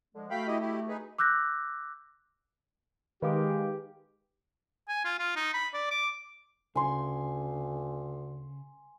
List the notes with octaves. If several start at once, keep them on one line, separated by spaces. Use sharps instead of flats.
D3 F3 G#3
A3 F#4 F5 G5 B5
E4 G4 D#5
E4 G4
D#4 G#4 B4
D6 E6 F#6 G6 A#6
D#3 G#3 G4 B4 F5 D6
G#5
F4
F4
D#4
B5
D5
D6
D2 C#3 G#5 C6